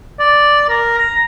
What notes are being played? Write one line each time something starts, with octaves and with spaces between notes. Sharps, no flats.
D5
A#4
A#5